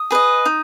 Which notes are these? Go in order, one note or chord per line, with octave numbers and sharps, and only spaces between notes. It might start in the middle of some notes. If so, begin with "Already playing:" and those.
Already playing: D#6
G#4 B4 D#5
D#4